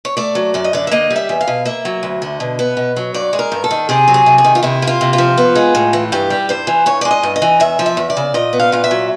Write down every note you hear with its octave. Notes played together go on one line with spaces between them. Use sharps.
C#5
A3 D5
F#3
F#2 D5
D#5
D3 D5
E5
A#3 D#5
G3
E5
E2
F5
B2
A#3 E5
F#3
D2
D3
B2
B3
B2
F#3
G2 D5
G#3
A#4
G2
A4
D#3
C3 G#4
F#3
G#4
C3
G#4
D#3
F4
C3 E4
A#3
F4
C3
F4
F3
B3
G#3
A2
E3
G2 G4
G3
G2 C5
E3
G2 C#5
G#3 D5
D#5
G2
D#5
E3
E2 E5
F3
E5
E2
D5
C#3
A#2 D#5
B3
F5
A#2 F5
E5
F#3